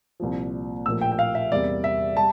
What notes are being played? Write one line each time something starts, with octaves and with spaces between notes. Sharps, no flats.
C2 A#2 F3
A#1 A2 F3 A#3 E6
G5
G5
F5
E5
E2 C3 G3 A#3 D5
E5
G3 A5